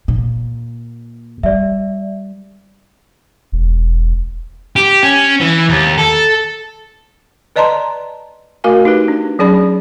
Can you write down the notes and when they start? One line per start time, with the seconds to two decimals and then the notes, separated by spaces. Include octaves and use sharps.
0.08 A#2
1.43 G3 D5 E5
3.52 E1
4.76 G4
5.03 C#4
5.41 E3
5.70 D#2
5.98 A4
7.56 B4 D5 D#5 A5 A#5 C6
8.64 A3 F#4 A#4 F5 G#5
8.85 D#4 G4 B4
9.08 D4
9.39 F#3 C#4 G#4 D5 B5